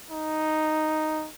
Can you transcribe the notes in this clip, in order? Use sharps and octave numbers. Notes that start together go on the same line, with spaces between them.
D#4